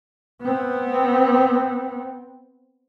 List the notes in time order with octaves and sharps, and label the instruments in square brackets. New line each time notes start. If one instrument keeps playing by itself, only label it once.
[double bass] B3 C4